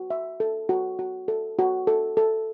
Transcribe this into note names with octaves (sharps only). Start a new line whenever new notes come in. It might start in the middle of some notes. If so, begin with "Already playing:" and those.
Already playing: F#4
E5
A4
F#4
F#4
A4
F#4
A4
A4